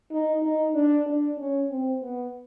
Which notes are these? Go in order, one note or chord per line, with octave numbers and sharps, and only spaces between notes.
D#4
D#4
D4
D4
C#4
C4
B3